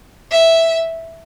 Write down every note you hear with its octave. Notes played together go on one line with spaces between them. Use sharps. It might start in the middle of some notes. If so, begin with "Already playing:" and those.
E5